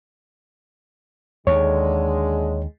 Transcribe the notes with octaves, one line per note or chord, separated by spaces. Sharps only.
D#2 D3 G#3 C#5